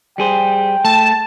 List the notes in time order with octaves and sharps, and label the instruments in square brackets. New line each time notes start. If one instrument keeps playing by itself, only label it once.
[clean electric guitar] G3 G#4 C5 [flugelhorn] G5
[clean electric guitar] A3 [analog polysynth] A5